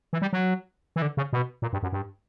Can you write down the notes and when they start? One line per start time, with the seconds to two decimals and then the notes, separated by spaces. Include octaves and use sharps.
0.13 E3
0.22 G3
0.33 F#3
0.96 E3
1.02 D3
1.17 C#3
1.33 B2
1.62 A#2
1.73 G2
1.83 F#2
1.92 G2